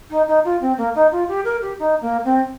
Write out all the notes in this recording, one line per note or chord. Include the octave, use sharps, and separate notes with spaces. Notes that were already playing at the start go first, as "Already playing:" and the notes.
D#4
D#4
F4
C4
A#3
D#4
F4
G4
A#4
G4
D#4
A#3
C4